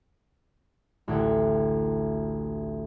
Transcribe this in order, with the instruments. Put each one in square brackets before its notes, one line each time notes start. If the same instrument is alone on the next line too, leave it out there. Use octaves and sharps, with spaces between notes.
[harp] A1 D2 F#5 G5 G#6